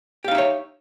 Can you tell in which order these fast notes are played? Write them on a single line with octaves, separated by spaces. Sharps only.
G4 F5 D#4 E5 C#5